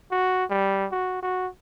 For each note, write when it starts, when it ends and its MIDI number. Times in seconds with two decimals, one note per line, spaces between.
0.11 0.44 66
0.50 0.86 55
0.92 1.18 66
1.23 1.48 66